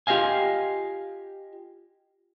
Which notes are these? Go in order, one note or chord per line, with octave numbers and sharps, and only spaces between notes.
F4 G4 C5 D#5 F5 G#5